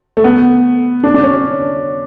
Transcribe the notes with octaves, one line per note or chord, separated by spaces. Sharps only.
A3
B3
D4
D4
C#4
C#4